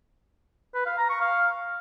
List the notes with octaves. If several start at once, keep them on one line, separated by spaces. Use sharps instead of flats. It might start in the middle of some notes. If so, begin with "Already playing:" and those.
B4
F5
A#5
C#6
F5